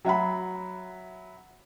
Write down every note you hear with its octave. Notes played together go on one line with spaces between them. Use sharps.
F#3 E5 F#5 B5